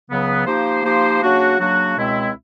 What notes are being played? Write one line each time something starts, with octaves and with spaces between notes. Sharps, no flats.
C#2 C#3 F#3 B3
F3 A#3 D#4 G4 C5
F3 A#3 D#4 G4 C5
C#3 F#3 A#3 D4 F#4
C#3 F#3 A#3 D4 F#4
C#2 B2 G#3 C4 E4